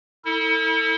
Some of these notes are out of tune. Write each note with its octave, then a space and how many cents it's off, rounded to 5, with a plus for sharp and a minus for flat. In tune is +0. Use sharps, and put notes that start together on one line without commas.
E4 -35 A4 +35